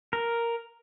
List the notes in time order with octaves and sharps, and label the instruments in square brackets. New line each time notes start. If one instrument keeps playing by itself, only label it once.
[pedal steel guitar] A#4